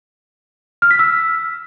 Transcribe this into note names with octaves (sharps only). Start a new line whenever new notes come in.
F6
B6
E6